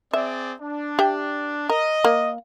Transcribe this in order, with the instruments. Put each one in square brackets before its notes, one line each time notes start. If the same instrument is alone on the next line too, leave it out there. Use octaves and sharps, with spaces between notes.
[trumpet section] C4 G#4 D5 [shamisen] E5
[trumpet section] D4
[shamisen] G4 E5 G5
[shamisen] A#4 [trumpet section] D#5
[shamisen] A#3